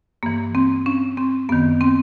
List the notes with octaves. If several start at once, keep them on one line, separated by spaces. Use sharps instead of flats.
G2 E3 A#3
C4
C#4
C4
F#2 D#3 B3
C4